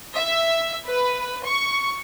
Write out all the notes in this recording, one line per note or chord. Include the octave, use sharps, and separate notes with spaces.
E5
B4
C#6